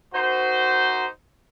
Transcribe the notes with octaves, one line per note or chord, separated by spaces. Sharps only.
D#4 F#4 A#4 C5